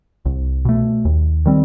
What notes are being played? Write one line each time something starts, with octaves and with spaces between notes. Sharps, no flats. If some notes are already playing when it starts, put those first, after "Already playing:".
C2
B2 A3
D#2
D#3 G3 C4